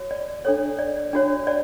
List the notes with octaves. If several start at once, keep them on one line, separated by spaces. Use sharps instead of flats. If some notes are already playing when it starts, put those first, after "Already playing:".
Already playing: F#4 C#5
D5
D4 A4 C#5
D5
D4 F#4 C#5
D5